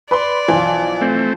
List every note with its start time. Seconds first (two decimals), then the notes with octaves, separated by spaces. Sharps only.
0.11 B4 D5 B5 C6
0.48 B1 E3 F3
1.01 A3 C4